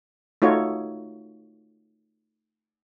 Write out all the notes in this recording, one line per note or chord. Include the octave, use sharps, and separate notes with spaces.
A3 D#4 F4 F#4 C#5